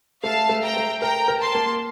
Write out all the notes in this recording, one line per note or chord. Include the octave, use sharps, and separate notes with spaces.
A3 F5 A5
A3
G5 A#5
A3
A#4 G5 A#5
A#4
A5 C6
A#3